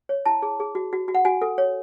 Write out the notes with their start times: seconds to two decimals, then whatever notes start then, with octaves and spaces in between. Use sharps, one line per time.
0.09 C#5
0.26 E4 A5
0.42 G#4
0.60 G#4
0.75 F#4
0.93 F#4
1.08 F#4
1.15 F#5
1.25 F#4 G#5
1.42 A4
1.58 C#5